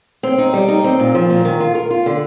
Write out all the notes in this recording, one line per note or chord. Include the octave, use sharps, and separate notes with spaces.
C4
D#4
G3
D#4
C4
A#2
F3
A#2
D#3
F4
A#4
F4
D3